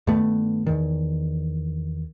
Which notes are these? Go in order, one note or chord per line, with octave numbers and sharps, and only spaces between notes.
G2 D#3 A3 B3
E2 D#3